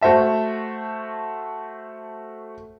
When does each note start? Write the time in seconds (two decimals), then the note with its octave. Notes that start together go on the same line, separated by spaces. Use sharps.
0.01 A3 F#4 C5 E5 A5